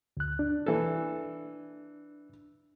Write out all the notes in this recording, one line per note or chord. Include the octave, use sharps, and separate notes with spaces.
D2 F#6
D4
E3 A4